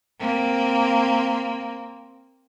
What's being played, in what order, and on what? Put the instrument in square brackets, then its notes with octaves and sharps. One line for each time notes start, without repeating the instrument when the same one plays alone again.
[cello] A#3 C4